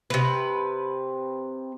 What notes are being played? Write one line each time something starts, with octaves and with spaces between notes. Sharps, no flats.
C3 B4